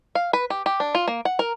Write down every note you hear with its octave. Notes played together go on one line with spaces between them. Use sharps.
F5
B4
G4
G4
D4
F4
A#3
F#5
A#4